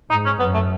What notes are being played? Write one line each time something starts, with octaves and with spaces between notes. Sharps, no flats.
G#2 D#4
C#4
F#2 B3
A3